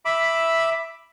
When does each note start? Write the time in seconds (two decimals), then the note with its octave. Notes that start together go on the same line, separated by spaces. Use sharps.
0.05 E5 B5 D6